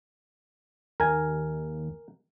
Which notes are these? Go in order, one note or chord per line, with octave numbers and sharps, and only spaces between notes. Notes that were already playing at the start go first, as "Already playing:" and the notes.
D#2 A#4 G#5